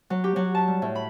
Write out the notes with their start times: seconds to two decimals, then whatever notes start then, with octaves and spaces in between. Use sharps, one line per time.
0.10 F#3
0.24 G4
0.36 F#3
0.55 A5
0.68 G3
0.82 A2
0.95 B5